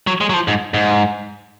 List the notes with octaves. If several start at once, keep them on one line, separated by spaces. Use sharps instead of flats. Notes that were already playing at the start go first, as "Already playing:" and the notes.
F#3
G#3
F#3
F3
G#2
G#2